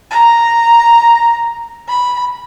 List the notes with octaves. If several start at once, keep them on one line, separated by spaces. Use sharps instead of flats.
A#5
B5